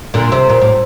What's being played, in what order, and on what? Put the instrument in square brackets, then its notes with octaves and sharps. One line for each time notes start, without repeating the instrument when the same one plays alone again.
[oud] A#2 D3
C3
A#2
A2